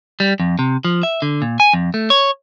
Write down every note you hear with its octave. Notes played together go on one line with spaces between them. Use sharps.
G3
F2
C3
F3
E5
D3
A#2
G#5
F2
A3
C#5